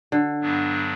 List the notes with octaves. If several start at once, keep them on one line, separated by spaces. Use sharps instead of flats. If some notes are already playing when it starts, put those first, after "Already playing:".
D3
G2 F#3 B3 D4